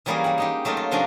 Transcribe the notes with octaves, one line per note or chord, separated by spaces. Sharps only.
E3 F#3 G3 A#3 C#4 G#4
G3 F#5
G#3 D#4 G4
F#3 A3 A#3 D#4 F4
F4
C3 F3 F#3 C#4 D4 A#4